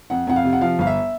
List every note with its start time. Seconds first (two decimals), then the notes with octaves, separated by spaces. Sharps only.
0.10 F2 F#5
0.27 F2 F#5
0.36 F5
0.44 C3
0.53 F#5
0.61 F3 F5
0.79 G1 F5
0.87 E5